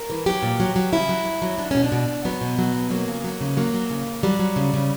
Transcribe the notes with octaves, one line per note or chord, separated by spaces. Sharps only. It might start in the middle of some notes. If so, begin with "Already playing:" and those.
Already playing: A#4
E3
F#3 G4
A#2
F#3
F#3
C#3 E4
F#3
F#3
F#3
F#3 D4
B2 C#4
D4
B2
B2
F#3 B3
B2
F#3
B2
F#3 A#3
C#3
F#3
C#3
F#3 A#3
F#3
C#3
C#3
F#3 G3
F#3
C#3
C#3